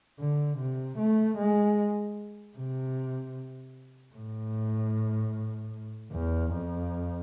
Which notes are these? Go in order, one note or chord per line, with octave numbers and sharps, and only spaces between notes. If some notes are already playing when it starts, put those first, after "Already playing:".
D3
C3
A3
G#3
C3
A2
E2
F2